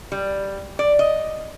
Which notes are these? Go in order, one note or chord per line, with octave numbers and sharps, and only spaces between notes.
G3
D5
D#5